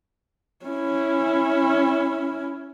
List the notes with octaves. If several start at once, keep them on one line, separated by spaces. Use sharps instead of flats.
C#4 E4